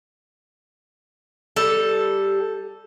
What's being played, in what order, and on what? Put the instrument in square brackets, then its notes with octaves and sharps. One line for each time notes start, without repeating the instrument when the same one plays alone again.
[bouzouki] G3 A4